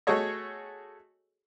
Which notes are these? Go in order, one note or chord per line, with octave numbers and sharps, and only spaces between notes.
A3 F#4 G#4 A4 C#5 D#5